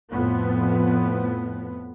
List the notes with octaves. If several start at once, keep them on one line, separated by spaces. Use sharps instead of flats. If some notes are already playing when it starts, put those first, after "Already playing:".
F2 A2 B3